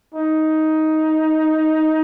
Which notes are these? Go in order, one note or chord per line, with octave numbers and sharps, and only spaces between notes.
D#4